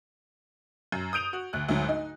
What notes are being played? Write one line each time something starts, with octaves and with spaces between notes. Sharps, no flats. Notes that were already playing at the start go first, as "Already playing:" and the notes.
F#2
D#6 G6 D7 F7
F#4
D2 F#6
D2 G#2 F#3
D#4